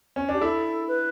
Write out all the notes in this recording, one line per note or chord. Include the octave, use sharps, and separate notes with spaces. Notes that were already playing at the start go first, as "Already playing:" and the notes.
C#4
D4 G4
E4 A4
B4